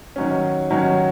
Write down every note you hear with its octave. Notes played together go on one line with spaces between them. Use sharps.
D#3 F#3 C#4
D#3 F#3 C#4